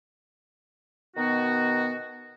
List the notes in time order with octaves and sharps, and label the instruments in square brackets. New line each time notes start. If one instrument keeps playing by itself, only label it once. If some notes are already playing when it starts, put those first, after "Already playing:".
[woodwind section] B2 D#3 B3 D#4 F#4